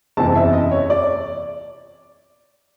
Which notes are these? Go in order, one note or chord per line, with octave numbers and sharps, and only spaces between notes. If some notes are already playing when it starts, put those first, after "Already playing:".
F#1 E2 C3 A5
E5
D#5
C#5
D5